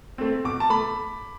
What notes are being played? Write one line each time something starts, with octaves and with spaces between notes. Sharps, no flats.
A3 C4
B2 D6
A5
A3 B5